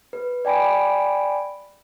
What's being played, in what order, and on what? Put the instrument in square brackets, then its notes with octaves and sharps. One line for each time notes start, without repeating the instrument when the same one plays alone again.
[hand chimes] B4
D5 G5 G#5 B5 D7